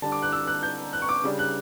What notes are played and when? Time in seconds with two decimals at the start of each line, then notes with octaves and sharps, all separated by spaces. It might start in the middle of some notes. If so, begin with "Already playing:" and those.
0.02 D3 G3 D4 A5
0.12 D6
0.22 F#6
0.32 E6
0.47 F#6
0.63 G6
0.93 F#6
1.02 C#6
1.09 D6
1.24 C#3 G3 D4
1.39 F#6